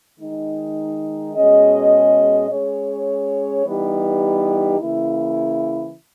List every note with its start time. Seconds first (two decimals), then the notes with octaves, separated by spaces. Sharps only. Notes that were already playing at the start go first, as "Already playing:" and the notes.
0.20 D#3 G#3 D#4
1.35 B2 G#3 C#4 G#4 D#5
2.50 G#3 C#4 G#4 C#5
3.65 E3 G3 B3 D#4 G4
4.79 C#3 E3 A#3 E4